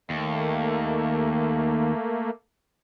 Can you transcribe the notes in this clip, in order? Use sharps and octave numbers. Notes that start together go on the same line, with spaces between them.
D#2 A3 A#3